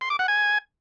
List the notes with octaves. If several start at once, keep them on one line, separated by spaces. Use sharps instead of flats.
C6
D6
F#5
G#5